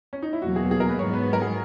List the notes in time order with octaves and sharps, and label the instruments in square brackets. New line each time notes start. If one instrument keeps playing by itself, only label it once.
[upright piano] C#4
D#4
E4
[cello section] E2 B2 F#3 A#3 [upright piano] F#4
[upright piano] G#4
G#4
A#4
B4
[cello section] G#2 F#3 B3 [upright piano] C#5
[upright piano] B4
A#4
G#4